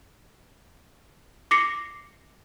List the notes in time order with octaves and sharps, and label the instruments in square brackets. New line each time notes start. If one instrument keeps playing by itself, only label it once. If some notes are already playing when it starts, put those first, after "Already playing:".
[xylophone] D6 A#6 C7 C#7